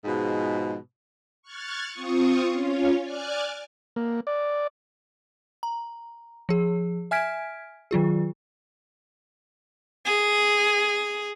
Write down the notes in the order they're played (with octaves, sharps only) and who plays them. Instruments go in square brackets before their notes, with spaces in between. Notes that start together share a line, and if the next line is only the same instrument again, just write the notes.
[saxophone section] G#2 B2 F3 G#3
[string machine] C#6 F6 F#6 G#6 A6
C4 F4 C#6 D#6
C#4 F4 C#5
D5 G#5 D6 F6 F#6 G#6
[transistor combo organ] A#3
D5
[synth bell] A#5
F3 G#4
E5 G#5 F6 G#6 B6 D7
D#3 F#3 F4 G#4
[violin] G#4